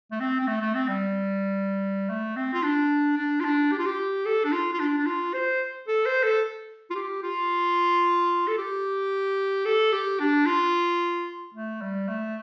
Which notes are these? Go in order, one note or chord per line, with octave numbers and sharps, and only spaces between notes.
A3
C4
C4
A3
A3
C4
G3
A3
C4
F4
D4
D4
F4
D4
G4
F4
G4
A4
D4
F4
F4
D4
D4
F4
C5
A4
C5
A4
F4
G4
F4
A4
G4
A4
G4
D4
F4
A3
G3
A3